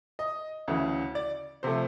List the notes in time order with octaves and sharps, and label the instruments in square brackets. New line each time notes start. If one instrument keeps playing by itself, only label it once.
[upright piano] D#5
D2 C#3 E3
D5
C3 F3 A3 C5